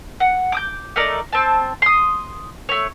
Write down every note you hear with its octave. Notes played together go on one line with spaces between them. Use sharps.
F#5
D6 D#6 G6
A3 D#4 A#4 D5
C4 A5
C6 D#6
A3 C#5